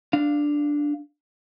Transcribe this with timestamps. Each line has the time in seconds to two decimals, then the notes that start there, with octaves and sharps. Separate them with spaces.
0.13 D4 F5